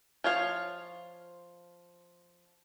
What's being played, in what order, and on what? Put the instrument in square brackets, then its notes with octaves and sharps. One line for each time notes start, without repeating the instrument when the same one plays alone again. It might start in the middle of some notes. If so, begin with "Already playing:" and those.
[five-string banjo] F3 C#5 F5